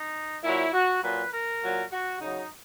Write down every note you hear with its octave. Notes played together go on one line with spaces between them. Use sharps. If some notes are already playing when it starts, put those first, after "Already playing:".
Already playing: D#4
A#2 F#3 E4
F#4
A#2 F#3 B4
A#4
A#2 F#3
F#4
C#3 F#3 D#4